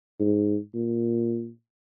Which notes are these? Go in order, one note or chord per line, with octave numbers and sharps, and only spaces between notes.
G#2
A#2